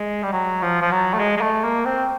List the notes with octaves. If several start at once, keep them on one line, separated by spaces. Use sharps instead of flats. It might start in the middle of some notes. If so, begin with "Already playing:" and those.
Already playing: G#3
G3
F#3
F3
F3
F#3
A3
G#3
G#3
A3
A#3
C4